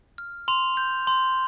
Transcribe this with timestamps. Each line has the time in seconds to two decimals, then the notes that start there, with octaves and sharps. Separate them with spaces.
0.18 F6
0.48 C6 F7
0.77 G6
1.07 C6